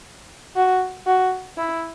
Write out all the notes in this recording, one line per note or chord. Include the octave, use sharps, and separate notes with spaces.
F#4
F#4
E4